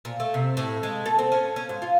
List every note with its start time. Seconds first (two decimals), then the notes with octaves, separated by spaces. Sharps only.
0.05 A#2
0.20 A3
0.34 C3
0.57 A2
0.83 G#3
1.06 A4
1.19 C4
1.32 C#4
1.56 C#4
1.69 G#2
1.82 F4